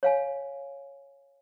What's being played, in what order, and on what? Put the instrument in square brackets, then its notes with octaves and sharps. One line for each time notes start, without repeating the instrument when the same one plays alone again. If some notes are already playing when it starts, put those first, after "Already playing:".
[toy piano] C#5 F5 G#5